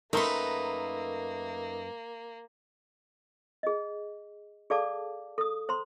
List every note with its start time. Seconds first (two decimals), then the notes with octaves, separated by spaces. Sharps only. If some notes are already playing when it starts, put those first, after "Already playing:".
0.13 F#2 A3 A#3 D#4 A#4 B4 C6
3.63 G#4 D#5
4.70 G#4 A4 D5 F5 A5 D6
5.38 A4 D#6
5.69 C5 A#5 C6